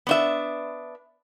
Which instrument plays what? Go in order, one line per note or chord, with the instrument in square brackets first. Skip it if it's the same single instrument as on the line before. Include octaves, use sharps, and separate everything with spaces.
[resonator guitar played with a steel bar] B3 D4 E5